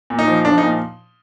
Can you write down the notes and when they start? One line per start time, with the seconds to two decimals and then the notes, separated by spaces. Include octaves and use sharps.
0.10 A#2
0.19 D#4
0.27 F3
0.45 F3 D4
0.58 D#4
0.62 A#2